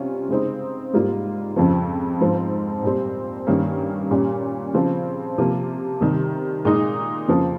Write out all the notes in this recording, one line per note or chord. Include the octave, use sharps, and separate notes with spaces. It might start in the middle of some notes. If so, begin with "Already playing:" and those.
Already playing: C3 G3 C#4 F4
C#3 G#3 C4 D#4
G#2 G3 A#3 F4
F2 C#3 F3
G#2 F3 C4
A#2 G3 C4
G2 D#3 A#3 C#4
A#2 G3 C#4
C#3 F3 C4
C3 F3 A#3
C3 D#3 G3
A#2 G#3 D#4
F2 C#3 F3 A#3